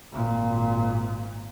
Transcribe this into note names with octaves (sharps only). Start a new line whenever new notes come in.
G#1 A#2